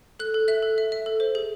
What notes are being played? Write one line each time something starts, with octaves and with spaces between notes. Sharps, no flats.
A4 F#6
A4
E5 F#6
A4
E5
E5
A4
C5
G#4